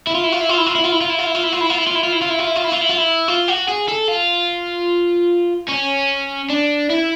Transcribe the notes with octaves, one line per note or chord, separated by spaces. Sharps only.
E4
F4
E4
F4
E4
F4
E4
F4
E4
F4
E4
F4
E4
F4
E4
F4
E4
F4
E4
F4
E4
F4
E4
F4
E4
F4
E4
F4
E4
F4
E4
F4
E4
F4
E4
F4
F#4
G#4
A4
F4
C#4
D4
E4